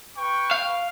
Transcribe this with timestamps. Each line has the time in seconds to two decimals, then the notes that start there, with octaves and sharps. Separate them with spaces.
0.17 B4 G5 C#6
0.51 F5